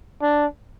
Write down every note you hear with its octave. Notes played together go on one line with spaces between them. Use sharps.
D4